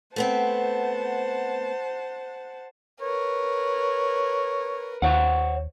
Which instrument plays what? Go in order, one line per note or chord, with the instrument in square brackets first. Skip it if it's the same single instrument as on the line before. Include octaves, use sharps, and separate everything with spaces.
[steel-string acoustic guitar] A3 B3 C4 [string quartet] C5 F#5 A5
[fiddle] A#4 B4 [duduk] C#5
[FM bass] D#2 [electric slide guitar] C5 C#5 F#5